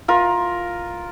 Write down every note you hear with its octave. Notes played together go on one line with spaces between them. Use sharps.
F4 A#4